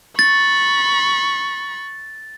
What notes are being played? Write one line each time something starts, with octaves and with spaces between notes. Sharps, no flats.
B5 C#6 A6